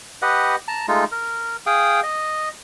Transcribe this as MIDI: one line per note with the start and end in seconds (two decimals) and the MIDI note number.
0.22 0.56 67
0.22 0.56 71
0.22 0.56 75
0.22 0.56 78
0.68 0.86 81
0.68 0.86 82
0.88 1.04 56
0.88 1.04 57
0.88 1.04 63
0.88 1.04 65
1.12 1.57 70
1.66 2.00 68
1.66 2.00 77
1.66 2.00 79
1.66 2.00 87
2.03 2.49 75